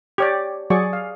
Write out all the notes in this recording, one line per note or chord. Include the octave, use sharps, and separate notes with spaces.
G4 C#5 D5
F#3 G#4 D5 C#6
F5